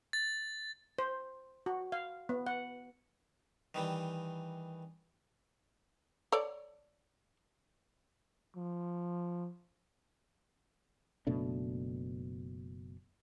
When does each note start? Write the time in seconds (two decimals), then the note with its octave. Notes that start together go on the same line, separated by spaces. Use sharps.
0.13 A6
0.98 C5
1.66 F#4
1.92 F5
2.29 B3
2.47 F#5
3.74 D#3 E3 G3
6.32 A4 C#5 D5
8.56 F3
11.27 F#1 B2 A3 D4